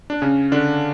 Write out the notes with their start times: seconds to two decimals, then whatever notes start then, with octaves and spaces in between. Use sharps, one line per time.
0.10 D4
0.22 C#3 C#4
0.52 D3 D4